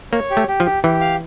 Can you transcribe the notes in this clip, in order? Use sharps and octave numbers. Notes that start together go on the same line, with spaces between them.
A#3 C#5
G4
A3
G4
F3
G4
E3 G4
F5